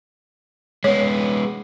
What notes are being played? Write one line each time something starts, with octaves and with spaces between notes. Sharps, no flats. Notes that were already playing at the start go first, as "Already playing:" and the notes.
G#3 B3 C#5